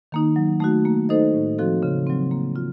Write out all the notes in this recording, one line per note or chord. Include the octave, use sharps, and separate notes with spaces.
D#3 A#3 D#4
F#3
A3 D#4 F#4
A#3
D#4 A4 C5 D#5
A2
F3 C4 F#4 A4
C#3
F#3 C4
A#3
F4